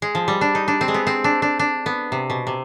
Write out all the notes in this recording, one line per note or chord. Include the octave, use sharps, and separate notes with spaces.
G#3
F3
G3
D4
D#4
D4
C4
G#3
B3
C4
D4
D4
D4
B3
C3
B2
C3